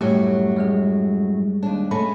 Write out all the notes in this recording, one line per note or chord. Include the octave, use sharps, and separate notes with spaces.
F#2 A2 F#3 G3 A3 G4
G3 G#3 G#4
D#2 D4
G#3 A3 C#4 B5